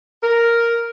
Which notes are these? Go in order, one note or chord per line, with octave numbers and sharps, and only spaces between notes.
A#4